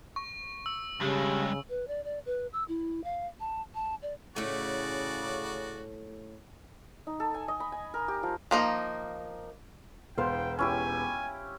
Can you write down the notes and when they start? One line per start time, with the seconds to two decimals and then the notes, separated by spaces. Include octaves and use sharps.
0.16 C#6
0.66 E6
1.01 G2 C#3 G#3 G4
1.69 B4
1.88 D5
2.04 D5
2.26 B4
2.53 E6
2.68 E4
3.04 F5
3.40 A5
3.75 A5
4.02 D5
4.36 A2 C#3 A3 F#4 D5
7.07 D#4
7.20 A4
7.34 G#5
7.48 D#5
7.60 B5
7.72 G#5
7.94 A#4
8.08 G4
8.23 F3
8.51 F3 A#3 D#4
10.18 E1 B3 C5 F5 G5 C6
10.59 C#4 E4 G4 G#5